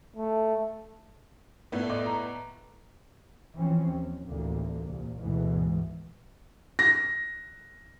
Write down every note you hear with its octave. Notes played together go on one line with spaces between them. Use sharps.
A3
A2 A3 B3 D5
D5 D#5 D6
A#5
E3 F3 C4 C#4
D#2
A1 D2 D3 A#3
C2 A#2
D2 G#2 B2 E3 G#3
A#6